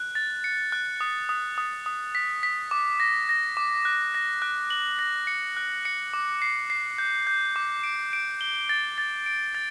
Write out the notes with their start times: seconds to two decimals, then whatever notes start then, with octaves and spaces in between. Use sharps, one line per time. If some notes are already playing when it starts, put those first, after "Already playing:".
Already playing: F#6
0.15 A6
0.44 C#7
0.72 F#6
1.01 D#6
1.29 D#6
1.58 D#6
1.86 D#6
2.15 B6
2.43 B6
2.71 D6
3.00 A#6
3.29 A#6
3.57 D6
3.85 F#6
4.15 A#6
4.42 F#6
4.70 F#7
4.99 A#6
5.27 C#7
5.57 F#6
5.85 C#7
6.14 D6
6.42 C7
6.70 C7
6.98 G6
7.27 G6
7.56 D6
7.84 D7
8.13 D7
8.41 G7
8.69 A6
8.98 A6
9.26 D7
9.55 A6